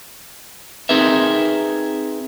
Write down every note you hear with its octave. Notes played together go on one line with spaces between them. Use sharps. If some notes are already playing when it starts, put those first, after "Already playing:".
C4 D#4 G#4 A#4 B4 E5